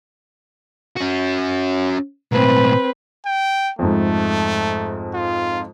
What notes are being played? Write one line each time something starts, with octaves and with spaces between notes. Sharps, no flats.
C#4 F#4
B1 A2 C4 B4
G5
F2 G#2 A3
F4